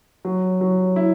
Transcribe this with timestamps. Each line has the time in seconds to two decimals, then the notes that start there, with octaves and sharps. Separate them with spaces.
0.25 F#3
0.61 F#3
0.96 E4